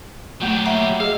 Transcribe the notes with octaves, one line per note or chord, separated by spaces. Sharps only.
F#3 A3 A#3 G4
E5 F#5 A#5
G#4 D#5 F5